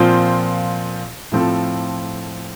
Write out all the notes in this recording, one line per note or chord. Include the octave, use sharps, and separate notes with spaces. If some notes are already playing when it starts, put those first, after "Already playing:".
Already playing: A#2 F3 C4 F4 C5
A2 F3 C4 F4 A4